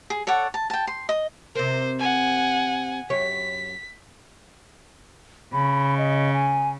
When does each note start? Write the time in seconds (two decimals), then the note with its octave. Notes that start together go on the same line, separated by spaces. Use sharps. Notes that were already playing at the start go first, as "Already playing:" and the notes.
0.10 G#4
0.27 A4 C#5 D5 F#5
0.54 A5
0.70 G5 A5
0.87 C6
1.09 D#5
1.55 C3 A#4 C5
1.99 F#5 G#5
3.10 F#2 G4 C#5 B6
5.53 C#3 B5
5.98 D#5
6.33 G#5